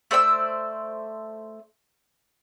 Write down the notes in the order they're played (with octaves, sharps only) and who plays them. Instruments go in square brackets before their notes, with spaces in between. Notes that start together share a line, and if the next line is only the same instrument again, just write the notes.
[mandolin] A3 C5 D5 E6